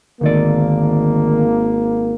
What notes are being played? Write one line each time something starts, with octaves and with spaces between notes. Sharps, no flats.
G#1 D2 D#3 A#3 D5